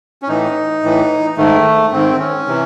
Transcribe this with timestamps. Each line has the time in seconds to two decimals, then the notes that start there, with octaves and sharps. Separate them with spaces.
0.22 C#4
0.28 A2 E3 D#4
0.83 A2 E3
1.37 G#2 D#3 A3
1.92 G#2 D#3 C4
2.19 C#4
2.47 C3 E3